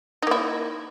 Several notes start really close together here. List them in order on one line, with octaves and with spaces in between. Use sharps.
D#4 A#3 E4